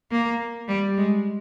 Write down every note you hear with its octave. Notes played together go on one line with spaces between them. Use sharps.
A#3
G3
G#3